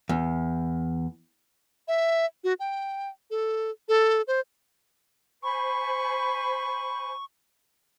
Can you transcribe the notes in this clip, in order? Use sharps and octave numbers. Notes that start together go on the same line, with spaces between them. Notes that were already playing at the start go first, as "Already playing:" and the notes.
E2
E5
F#4
G5
A4
A4
C5
C5 G#5 B5 C#6